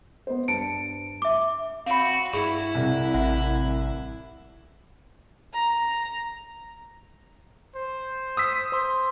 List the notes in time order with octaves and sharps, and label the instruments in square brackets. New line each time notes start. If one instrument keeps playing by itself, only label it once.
[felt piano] B3 C5
[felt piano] G2 A5 C#7 [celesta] D7
[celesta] E5 D6
[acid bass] C4 [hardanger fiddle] F#4 [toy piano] F5 B5
[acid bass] G2 [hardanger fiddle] E4 [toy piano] G#4 C#6
[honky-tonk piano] C2
[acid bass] A1 [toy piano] E5 F#5
[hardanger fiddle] A#5
[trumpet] C5
[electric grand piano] D#6 E6 B6
[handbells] C5 C6